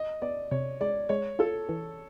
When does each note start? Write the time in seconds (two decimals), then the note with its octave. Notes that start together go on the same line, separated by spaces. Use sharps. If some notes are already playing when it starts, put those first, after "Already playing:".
Already playing: D#5
0.22 B3 D5
0.51 C3 C#5
0.81 G#3 D5
1.09 G#3 C#5
1.39 F4 A4
1.69 E3